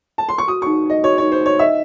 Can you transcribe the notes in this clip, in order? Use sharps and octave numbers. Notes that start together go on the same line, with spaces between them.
A5
C6
C#6
F#4 D#6
D#4 C#6
D#4 D#5
F#4 C#5
D#4 C#5
C5
D#4 C#5
D#5 E5